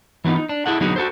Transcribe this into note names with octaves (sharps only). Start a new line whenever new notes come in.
E3 F#3 B3 D#4 F4
D#4
D4
E4 G#4 A4 F#5
D3 F#3 B3 D#4 F#4 G#4
F#4 A4 C5